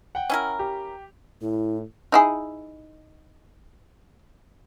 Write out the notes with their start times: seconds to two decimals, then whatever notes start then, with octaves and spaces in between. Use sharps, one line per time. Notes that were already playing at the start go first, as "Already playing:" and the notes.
0.15 F#5 G5
0.30 C#4 E4 A#4
0.59 G4
1.41 A2 E4
2.12 D#4 E4 G#4